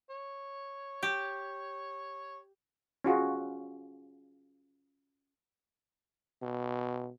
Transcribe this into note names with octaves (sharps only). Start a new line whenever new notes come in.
C#5
G4
C#4 F4 F#4 G#4
B2